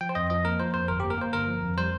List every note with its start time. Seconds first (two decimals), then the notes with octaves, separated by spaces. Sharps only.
0.01 F3 G5
0.09 C5
0.15 F2 D#5
0.30 F3 D#5
0.45 A#3 A#4
0.60 F3 C5
0.74 F2 C5
0.88 G1 A#4
1.00 A#3 G4
1.10 A#4
1.18 A#3 C5
1.33 G1 A#4
1.48 F3
1.63 F2
1.78 G3 C5